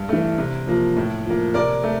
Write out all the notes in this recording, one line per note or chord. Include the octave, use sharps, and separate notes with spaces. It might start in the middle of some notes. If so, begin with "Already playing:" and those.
Already playing: G2
E3 A3
C3
F3 A#3
A2
F3 A#3
C3 A#4 D5
A3